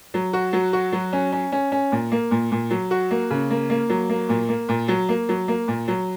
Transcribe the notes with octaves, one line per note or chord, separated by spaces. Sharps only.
F#3
F#4
F#3
F#4
F#3
C#4
C#4
C#4
C#4
A#2
A#3
A#2
A#2
F#3
F#4
A#3
C#3
A#3
A#3
F#3
A#3
A#2
A#3
A#2
F#3
A#3
F#3
A#3
A#2
F#3